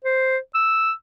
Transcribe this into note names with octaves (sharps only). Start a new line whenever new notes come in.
C5
E6